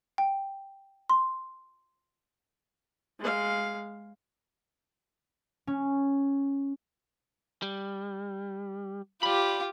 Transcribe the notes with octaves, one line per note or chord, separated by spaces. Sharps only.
G5
C6
G#3 F5
C#4
G3
F4 G4 D5 B5